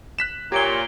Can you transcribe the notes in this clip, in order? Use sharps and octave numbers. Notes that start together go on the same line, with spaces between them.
F#6 B6 E7
A#2 G4 C#5 G#6 D7 G7